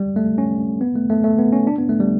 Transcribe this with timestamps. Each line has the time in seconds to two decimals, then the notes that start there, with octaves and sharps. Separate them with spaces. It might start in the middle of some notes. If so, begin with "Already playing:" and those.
Already playing: G3
0.16 A3
0.38 C#4
0.81 B3
0.96 A3
1.10 A3
1.24 A3
1.39 B3
1.53 C#4
1.67 D4
1.78 B3
1.89 A3
2.00 G3